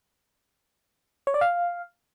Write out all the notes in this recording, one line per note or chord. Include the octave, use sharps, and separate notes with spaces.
C#5
D5
F5